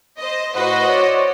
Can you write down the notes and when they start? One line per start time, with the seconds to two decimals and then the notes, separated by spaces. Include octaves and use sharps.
0.18 C5 D#5
0.55 A2 F#4 B4 C5 D#5
0.88 C#5 D5